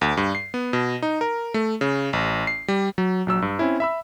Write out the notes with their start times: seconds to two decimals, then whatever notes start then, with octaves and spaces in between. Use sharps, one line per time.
0.01 D2
0.17 G2
0.35 C7
0.54 B3
0.73 B2
1.02 D#4
1.21 A#4
1.54 A3
1.81 C#3
2.13 A1
2.47 C7
2.68 G3
2.98 F#3
3.27 A#1 F#3 E6
3.42 G2
3.59 C4 C#4 E4
3.80 E5 B5 E6